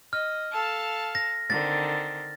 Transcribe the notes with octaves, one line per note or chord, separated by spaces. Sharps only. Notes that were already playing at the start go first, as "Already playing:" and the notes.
D#5 F6
A4 F5 A5
A#6
D3 D#3 C4 A6